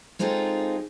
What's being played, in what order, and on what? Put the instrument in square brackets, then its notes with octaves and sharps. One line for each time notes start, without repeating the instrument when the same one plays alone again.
[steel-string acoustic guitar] G#3 C4 D#4 F4 G#4 A4